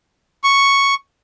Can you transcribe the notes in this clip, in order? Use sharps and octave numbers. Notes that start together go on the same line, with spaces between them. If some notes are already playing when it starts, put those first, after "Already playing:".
C#6